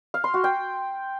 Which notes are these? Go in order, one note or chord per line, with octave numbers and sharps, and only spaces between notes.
F5
C6
F#4
G5